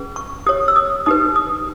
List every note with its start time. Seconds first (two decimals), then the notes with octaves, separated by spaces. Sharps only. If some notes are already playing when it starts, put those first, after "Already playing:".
Already playing: C#4 G#4 B4
0.16 C#6
0.46 G4 C#5 D#6
0.68 E6
0.76 D#6
1.06 D#4 G4 B4 D#6
1.36 D#6